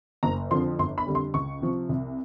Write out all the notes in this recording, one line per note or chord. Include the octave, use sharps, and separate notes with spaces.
F#1 A#5
F2 D3 F3 C6
G1 C6
B5
F2 D3 G3
C6
C#2 C#6
C3 F3
C2